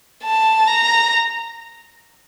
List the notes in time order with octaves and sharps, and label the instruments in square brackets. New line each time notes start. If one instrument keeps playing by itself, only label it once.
[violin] A5
A#5